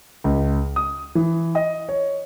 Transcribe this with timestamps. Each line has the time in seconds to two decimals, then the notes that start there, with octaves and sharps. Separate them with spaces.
0.24 C#2
0.76 D#6
1.15 E3
1.55 D#5
1.89 C#5